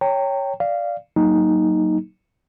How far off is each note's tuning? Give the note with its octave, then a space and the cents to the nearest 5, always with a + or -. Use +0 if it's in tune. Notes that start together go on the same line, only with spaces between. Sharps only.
C#5 +0 G5 +0 A#5 -35
D5 +0 F5 -10
F#3 +20 A#3 +0 D#4 +0